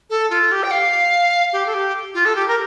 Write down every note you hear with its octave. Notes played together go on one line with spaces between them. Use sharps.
A4
F4
G4
G5
F5
G4
A4
G4
F4
A4
G4
A#4